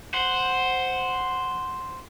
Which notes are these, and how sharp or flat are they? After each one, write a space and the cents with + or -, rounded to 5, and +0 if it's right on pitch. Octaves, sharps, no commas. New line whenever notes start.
C5 +0 F#5 +0